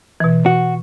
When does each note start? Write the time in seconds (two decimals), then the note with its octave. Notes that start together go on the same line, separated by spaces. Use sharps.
0.20 B2 E3
0.46 F#4